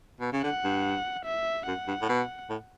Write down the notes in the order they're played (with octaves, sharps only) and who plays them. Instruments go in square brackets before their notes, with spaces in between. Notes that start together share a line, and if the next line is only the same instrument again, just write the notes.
[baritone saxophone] B2
C#3
[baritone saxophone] D3 [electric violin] F#5
[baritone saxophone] G2
[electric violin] E5
[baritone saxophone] F#2 [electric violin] F#5
[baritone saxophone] G2
A2
B2
A2